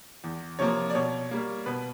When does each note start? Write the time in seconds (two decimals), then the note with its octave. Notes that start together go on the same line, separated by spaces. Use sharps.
0.24 E2
0.59 C3 F3 A#3 C#5
0.90 D5
0.95 B2 C#5
1.31 G3 A#3
1.66 B2 B4